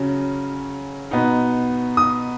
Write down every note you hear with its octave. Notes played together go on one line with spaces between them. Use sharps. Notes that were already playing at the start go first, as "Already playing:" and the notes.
Already playing: C#3 F#3 C#4
B2 B3 D#4
D#6